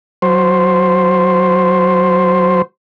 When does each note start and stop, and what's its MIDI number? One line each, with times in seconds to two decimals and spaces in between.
0.22 2.62 54
0.22 2.62 72